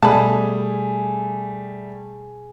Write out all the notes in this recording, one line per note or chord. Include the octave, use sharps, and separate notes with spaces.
B2 G3 A3 G#4 A5 B5